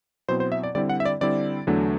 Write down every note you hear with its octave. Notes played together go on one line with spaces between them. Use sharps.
B2 F#3 C4 E4 C5
C5
E5
D5
D3 G3 C4 E4 D5
F#5
E5
D5
D3 G3 C4 E4 D5
E2 D3 F#3 A3 D4